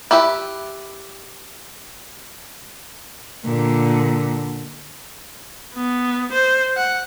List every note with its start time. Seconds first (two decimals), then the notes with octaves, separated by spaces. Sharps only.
0.11 E4 G4 B4 E5
3.46 A#2 D3
5.74 B3
6.32 C5
6.76 F#5